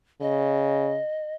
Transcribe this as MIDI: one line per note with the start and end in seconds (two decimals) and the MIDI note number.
0.21 0.99 49
0.21 1.35 75